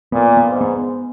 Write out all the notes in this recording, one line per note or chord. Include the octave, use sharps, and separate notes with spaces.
A#2 B3
B3
G#2
B3